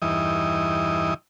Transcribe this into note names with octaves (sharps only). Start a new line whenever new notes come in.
E2 G2 E3 D#4 D#5